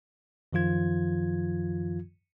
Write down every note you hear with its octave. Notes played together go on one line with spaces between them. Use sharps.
F#2 D#3 F3 F4 G#6